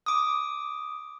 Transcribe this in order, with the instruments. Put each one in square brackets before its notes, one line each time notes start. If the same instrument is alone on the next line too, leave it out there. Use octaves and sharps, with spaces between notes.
[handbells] D6 D#6